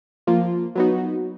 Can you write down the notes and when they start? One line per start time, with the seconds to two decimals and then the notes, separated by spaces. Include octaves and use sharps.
0.27 F3 A#3 F4
0.75 F#3 B3 D#4 F#4